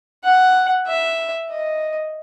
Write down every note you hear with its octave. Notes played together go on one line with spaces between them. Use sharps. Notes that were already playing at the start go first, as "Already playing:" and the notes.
F#5
E5
D#5